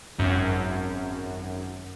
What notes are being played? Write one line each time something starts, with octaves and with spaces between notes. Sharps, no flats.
G#1 F#2